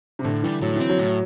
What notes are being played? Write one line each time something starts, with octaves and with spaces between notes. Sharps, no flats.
C3
A2 D3
E3 G3
A2 F#3
E3 C4
F#3
A2